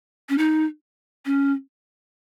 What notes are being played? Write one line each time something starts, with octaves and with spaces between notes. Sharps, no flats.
C#4
D#4
C#4